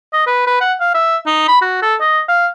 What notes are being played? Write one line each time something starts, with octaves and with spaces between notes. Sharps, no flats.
D#5
B4
B4
F#5
F5
E5
D#4
B5
F#4
A4
D#5
F5